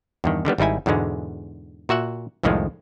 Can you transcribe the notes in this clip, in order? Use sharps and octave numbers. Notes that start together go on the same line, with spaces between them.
E2 G2 D#3
D3 D#3 G3 B3
G#1 G3 D#4 E4 G#5
E2 G#2 B2 D3 G#3
A#2 F#4 E5 F#5
C2 F2 A2 D#3 F3 G#3